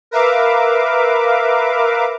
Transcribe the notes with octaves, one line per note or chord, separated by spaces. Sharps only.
A#4 B4 E5 F5 D6